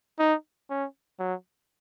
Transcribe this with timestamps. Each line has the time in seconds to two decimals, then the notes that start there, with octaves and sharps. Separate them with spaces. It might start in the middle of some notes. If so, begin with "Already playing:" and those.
0.19 D#4
0.70 C#4
1.19 F#3